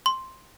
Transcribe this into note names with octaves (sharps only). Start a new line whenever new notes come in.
C6